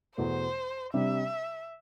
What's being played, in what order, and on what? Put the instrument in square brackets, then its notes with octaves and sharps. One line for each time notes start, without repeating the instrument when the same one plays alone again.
[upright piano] E2 B2 A3 [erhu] C5
[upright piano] C3 G3 D4 [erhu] E5